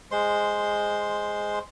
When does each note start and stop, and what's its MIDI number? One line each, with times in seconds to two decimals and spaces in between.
0.12 1.59 56
0.12 1.59 72
0.12 1.59 84